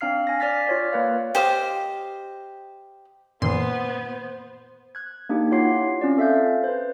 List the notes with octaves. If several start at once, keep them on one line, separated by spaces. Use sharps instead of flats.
C4 D4 F5 F6 C7
G#5 A#6
D5 F6 A6 B6
F4 C#5 D5
A#3 B4 F5
G4 C5 D#5 F5
F#2 A#2 D#3 E3 B3 C5 C6
F#6 G#6
A#3 D4 D#4 G4
E4 F4 C#5 F#5 D6 C7
C4 C#4 F4 D5
C4 A4 E5 F5 G6
B4 C5